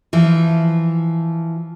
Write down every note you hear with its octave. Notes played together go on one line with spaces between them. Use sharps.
E3 F3